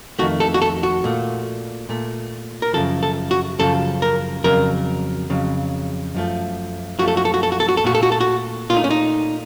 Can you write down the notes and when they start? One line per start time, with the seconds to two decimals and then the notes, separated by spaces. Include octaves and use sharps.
0.19 F2 D#3 A3 F#4
0.40 A4
0.54 F#4
0.62 A4
0.83 F#4
1.04 A#2 A3
1.89 A#2 A3
2.62 A#4
2.73 F#2 C#3 F3 A4
3.03 A4
3.31 F#4
3.59 F#2 C#3 F3 A4
4.02 A#4
4.44 F2 C#3 F#3 A#4
5.30 F2 C#3 F#3
6.14 F#2 F3 A3
6.99 F#2 F3 A3 F#4
7.08 A4
7.17 F#4
7.25 A4
7.34 F#4
7.43 A4
7.52 F#4
7.60 A4
7.69 F#4
7.77 A4
7.84 A#2 A3 F#4
7.95 A4
8.03 F#4
8.12 A4
8.21 F#4
8.70 A#2 F4
8.73 A3 D#4
8.84 C#4
8.90 D#4